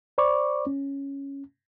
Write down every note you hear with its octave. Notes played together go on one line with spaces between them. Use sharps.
C5 D5 B5 C#6 D6
C#4